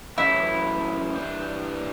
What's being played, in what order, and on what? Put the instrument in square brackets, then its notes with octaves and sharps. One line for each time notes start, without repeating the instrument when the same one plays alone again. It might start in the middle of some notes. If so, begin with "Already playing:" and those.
[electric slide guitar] F#2 E3 A3 C#4 G4 [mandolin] E4
[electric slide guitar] G2 E3 G3